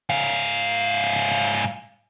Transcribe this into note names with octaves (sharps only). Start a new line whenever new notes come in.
G#2 F5